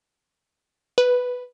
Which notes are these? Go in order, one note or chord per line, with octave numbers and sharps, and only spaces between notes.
B4